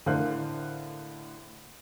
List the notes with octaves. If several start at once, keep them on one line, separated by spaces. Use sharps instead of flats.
A2 D3 A#4 C5 F5 F#6